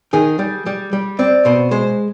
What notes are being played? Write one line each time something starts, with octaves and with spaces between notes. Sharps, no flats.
D#3 G#4
G3
G3
G3
C4 D5
B2 C5
G#3 C5